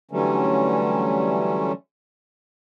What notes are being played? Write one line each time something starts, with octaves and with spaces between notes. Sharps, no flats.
D3 E3 F#3 G3 A3 C#4